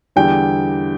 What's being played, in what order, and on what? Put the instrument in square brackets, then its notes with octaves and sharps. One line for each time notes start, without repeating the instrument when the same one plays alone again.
[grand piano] E2 D3 G3 G5